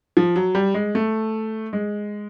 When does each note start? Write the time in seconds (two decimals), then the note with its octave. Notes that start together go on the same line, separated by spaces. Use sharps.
0.17 F3
0.36 F#3
0.55 G3
0.74 G#3
0.95 A3
1.73 G#3